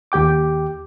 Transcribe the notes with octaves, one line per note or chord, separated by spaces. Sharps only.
D#2 G4 G5 D6